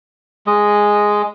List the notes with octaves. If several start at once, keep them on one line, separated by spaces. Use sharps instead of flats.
G#3 D#5